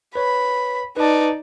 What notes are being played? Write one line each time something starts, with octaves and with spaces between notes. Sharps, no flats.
B4 C#5 B5
D#4 B4 D5 A5